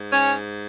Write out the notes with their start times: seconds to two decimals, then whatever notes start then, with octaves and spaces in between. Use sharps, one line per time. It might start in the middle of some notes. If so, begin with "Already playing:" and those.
Already playing: G#2
0.12 C#4